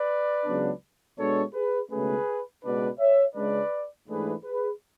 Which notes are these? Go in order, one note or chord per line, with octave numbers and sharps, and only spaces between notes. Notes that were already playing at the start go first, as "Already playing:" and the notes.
Already playing: B4 D5
C#2 C#3 F#3 B3 D4
B2 G#3 D4 A4 C#5
G#4 B4
C#2 B2 A3 C#4 G#4 B4
C#2 B2 G#3 B3 D4 B4 D5
C#5 E5
C#2 C#3 G#3 D4 B4 D5
G#2 E3 A3 D4 G#4 B4
G#4 B4